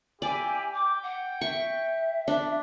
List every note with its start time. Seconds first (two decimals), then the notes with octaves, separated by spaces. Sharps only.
0.22 E4 G4 D5 G#5
0.73 G5 D6
1.03 F#5
1.41 E5 C#6
2.28 D4